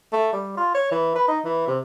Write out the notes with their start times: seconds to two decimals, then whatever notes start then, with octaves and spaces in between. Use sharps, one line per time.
0.13 A3
0.33 G3
0.57 F4
0.75 C#5
0.91 E3
1.15 B4
1.28 D#4
1.45 E3
1.67 C3